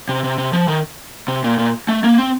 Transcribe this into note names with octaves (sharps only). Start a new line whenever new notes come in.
C3
C3
C3
F3
D#3
C3
A#2
A#2
A3
A#3
C4